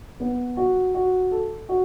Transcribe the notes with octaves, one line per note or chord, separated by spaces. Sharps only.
B3
F#4
F#4
A4
F#4